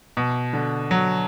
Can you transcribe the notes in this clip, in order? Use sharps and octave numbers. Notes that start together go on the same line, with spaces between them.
B2
D3
F#3